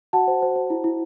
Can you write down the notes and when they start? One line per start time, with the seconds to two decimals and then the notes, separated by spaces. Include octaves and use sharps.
0.13 F#4 F#5 A5
0.27 C5
0.42 C5
0.56 C5
0.70 E4
0.84 E4